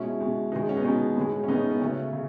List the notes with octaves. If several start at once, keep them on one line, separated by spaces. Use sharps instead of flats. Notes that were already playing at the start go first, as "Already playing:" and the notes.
Already playing: B2 G#3 C#4 E4
B2 G#3
B2 G#3 B3 D#4
C#4
B3 D#4
B2 G#3 C#4
A2 G#3
C#4
A2 G#3 B3 D#4
C#4
B3
C#3 F#3 A3 C#4
C#3